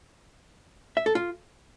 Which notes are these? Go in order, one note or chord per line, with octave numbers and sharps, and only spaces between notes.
E5
A4
F4